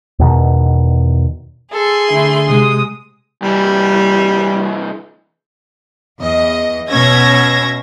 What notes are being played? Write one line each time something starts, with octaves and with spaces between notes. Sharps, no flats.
E2 B2 D#3
G#4 A4 C6
D3 A3 E4
C3 G#3 D#6
C2 E3 G3
E2 D#5
B2 C#4 E5 G#6 A#6